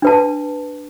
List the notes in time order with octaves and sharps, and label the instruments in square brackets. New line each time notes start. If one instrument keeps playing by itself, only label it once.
[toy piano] D4 B4 A5